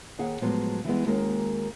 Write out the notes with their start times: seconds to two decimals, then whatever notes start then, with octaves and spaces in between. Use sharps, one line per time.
0.19 D#2 G#4 F#5
0.41 A2 F3 F#3 G#3 B3
0.85 E3 G3 G#3 B3
1.07 D#2 G#3 A#3 C#4 F#4 A#4